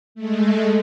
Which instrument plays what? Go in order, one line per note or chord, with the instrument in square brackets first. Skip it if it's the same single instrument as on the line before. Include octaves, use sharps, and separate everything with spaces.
[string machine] G#3 A3